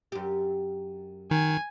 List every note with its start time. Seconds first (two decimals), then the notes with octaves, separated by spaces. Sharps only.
0.12 F#2 G4
1.31 D#3 G#5